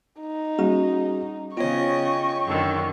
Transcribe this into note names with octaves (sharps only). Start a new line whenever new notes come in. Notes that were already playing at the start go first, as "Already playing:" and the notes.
D#4
G3 A#3 C#4 F#4 G#4
C#3 B3 F4 C5 C#5 D#5 G5 C#6
F#2 D3 D#3